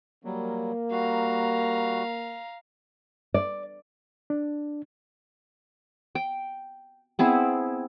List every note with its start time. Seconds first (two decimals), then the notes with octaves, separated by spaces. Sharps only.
0.25 F#3 G3 A#3
0.91 G3 F#4 F5 A#5
3.34 D5
4.30 D4
6.15 G5
7.19 B3 C4 E4 G#4